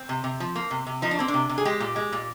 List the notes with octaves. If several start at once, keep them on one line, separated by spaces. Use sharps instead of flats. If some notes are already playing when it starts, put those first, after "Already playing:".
Already playing: C4
C3
C3
F3
A#3
C3
C3
F3 D#4
D4
A#3 C4
D4
C3
C3
G#4
G#3 G4
A#2
G#3
A#2